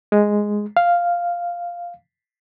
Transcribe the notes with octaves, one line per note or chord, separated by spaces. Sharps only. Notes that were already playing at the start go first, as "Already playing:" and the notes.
G#3
F5